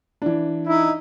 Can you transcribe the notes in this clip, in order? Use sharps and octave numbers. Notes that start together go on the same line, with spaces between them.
E3 D4
D#4 E4